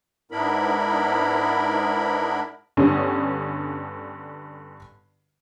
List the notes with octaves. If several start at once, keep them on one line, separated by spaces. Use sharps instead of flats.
G#2 B3 D4 E4 A#4 B5
G2 D3 B3 C#4